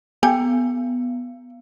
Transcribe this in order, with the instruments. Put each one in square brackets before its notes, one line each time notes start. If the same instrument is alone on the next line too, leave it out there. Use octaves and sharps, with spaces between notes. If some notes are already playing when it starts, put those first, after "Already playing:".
[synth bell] B3 [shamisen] G4 G5 G#5